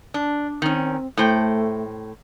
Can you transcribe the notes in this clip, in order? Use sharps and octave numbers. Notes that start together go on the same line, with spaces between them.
D4
D#3 C4 C#4
A2 A3 C5 G5